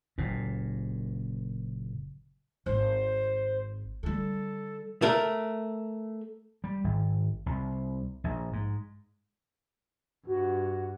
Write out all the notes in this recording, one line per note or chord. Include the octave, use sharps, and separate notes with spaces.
F#1 A#2
G#1 C5
D3 G3 A4
A3 A#4
G3
G#1
C2
A#1
G#2
G2 F#4